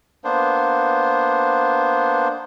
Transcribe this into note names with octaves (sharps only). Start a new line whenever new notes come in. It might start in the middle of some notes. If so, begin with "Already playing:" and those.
A#3 B3 D4 C5